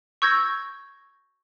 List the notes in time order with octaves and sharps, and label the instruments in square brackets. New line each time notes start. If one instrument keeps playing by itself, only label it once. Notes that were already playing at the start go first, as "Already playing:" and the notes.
[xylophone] C#6 E6 G6 G#6 A#6